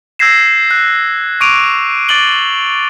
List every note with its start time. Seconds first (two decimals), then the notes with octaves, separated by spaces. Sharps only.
0.19 E6 G6 G#6 A#6 C7 E7
0.71 F#6
1.41 C#6 D6 D7 D#7 F7
2.09 D6 A6 D7 F#7 G7